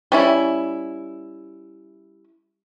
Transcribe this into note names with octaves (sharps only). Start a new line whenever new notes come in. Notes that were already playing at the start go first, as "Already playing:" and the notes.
G3 C#4 E4